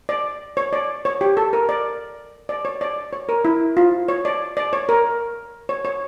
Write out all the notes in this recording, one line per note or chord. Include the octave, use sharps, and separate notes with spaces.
D5
C#5
D5
C#5
G4
A4
A#4
D5
D5
C#5
D5
C#5
A#4
E4
F4
C#5
D5
D5
C#5
A#4
C#5
C#5